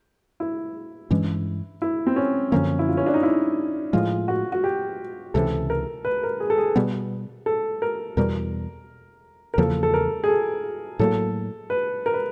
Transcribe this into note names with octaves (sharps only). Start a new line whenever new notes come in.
E4
G2 E3 G#3 C#4
E4
C4
C#4
F#2 D3 F3 A#3 C#4
E4
F4
C#4
D4
D#4
E4
A2 F3 G#3 F4
F#4
F#4
G4
C#2 C3 E3 A4
A#4
B4
A#4
G#4
A4
G#4
B2 G3 B3
A4
A#4
E2 B2 G3 A#4
A#4
E2 C#3 F3 A#3 A4
A4
A#4
G#4
A4
A2 F#3 A#3 A4
B4
A#4
B4